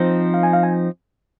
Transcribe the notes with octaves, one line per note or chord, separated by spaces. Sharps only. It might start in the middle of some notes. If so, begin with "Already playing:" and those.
Already playing: F3 C4 D#4
F5
G#5
F5
G#5